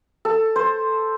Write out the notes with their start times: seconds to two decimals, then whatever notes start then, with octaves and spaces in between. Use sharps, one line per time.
0.25 A4
0.56 C5